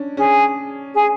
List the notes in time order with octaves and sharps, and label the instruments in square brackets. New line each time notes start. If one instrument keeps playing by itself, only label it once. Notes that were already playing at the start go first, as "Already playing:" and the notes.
Already playing: [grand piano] C#4 D4
[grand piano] C#4 [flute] G#4
[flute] G#4